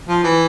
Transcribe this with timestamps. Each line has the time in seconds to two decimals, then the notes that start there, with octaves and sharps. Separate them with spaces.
0.09 F3
0.24 E3